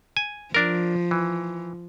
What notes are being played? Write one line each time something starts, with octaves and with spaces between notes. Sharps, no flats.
G#5
F3 D4 A#4
E3